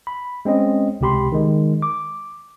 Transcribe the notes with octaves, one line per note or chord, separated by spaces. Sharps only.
B5
G#3 C4 C#4 D#5
C#2 C3 G4 B5 C6
D#3 G#3
D6